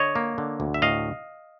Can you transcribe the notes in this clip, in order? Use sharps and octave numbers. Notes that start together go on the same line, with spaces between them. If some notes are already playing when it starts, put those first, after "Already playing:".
Already playing: D3 C#5 D#5
A#3
D3
D2
E5
A2 D#5 F5